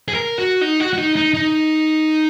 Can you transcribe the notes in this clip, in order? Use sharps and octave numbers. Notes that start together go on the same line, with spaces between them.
G#4
A#4
F#4
D#4
F#4
F#4
D#4
D#4
D#4